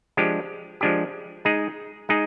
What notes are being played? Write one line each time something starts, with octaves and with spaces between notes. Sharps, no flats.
F3 G#3 D4 G4
F3 G#3 D4 G4
G#3 D#4 G#4
G#3 D#4 G#4